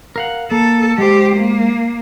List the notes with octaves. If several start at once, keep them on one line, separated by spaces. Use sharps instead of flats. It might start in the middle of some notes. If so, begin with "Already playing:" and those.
A#4 F5 F#5
A#3 A4
G#3 G4 C5
A#3